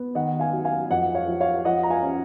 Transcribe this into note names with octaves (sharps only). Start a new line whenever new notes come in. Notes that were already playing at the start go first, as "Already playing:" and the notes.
Already playing: B3
D#3 D#5 F#5
F5 G#5
F#3
F5 G#5
F2 D#5 F#5
C#5 F5
F3
C#5 F5
F3 D#5 F#5
A#5
F5 G#5
C#4